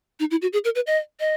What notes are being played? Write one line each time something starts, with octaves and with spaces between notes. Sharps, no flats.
D#4
E4
F#4
G#4
A#4
B4
D#5
D#5